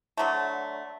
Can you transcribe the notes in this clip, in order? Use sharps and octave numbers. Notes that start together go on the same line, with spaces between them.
D3 F#3 A3